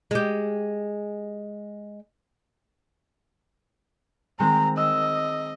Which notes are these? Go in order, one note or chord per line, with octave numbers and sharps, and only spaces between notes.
G#3 G4
D#3 G#3 C4 A#5
D#5 E6